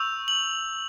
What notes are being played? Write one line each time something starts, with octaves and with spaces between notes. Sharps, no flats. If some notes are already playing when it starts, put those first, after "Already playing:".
Already playing: C#6 E6 G6 F7
F#7